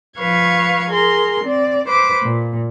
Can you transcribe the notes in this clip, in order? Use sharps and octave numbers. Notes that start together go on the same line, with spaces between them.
F3 B4 F5 C#6 G#6
G#4 A#4 C6
C4 D5
B4 C5 D6
A#2